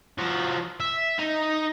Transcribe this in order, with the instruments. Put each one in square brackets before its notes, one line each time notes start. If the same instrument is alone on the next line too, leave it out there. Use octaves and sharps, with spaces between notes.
[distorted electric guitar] F3 F#4
E5
D#4